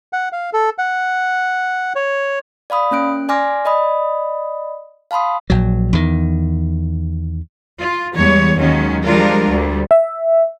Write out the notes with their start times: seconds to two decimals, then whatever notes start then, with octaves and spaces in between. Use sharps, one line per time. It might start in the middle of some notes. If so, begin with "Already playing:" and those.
0.13 F#5
0.32 F5
0.53 A4
0.78 F#5
1.95 C#5
2.70 D5 F5 B5 D#6
2.91 A#3 C#4 F#6 D7
3.29 D5 G#5 C6 D6 F6 A#6
3.65 D5 D#5 B5 D#6
5.11 F5 A5 B5 C6 D#6
5.50 A#1 F#3
5.93 E2 D#3
7.79 F4
8.14 E2 G3 G#3 C#5
8.56 D#2 D#3 F#3 G#3 C#4
9.05 F3 G3 G#3 D4 F4 A#4
9.48 D2 G3
9.91 E5